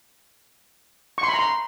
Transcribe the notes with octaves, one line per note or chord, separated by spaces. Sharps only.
C#6
C6
B5
A#5
C6